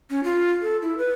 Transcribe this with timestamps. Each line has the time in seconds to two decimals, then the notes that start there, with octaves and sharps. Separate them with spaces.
0.10 C#4
0.24 F4
0.62 A4
0.82 E4
0.98 B4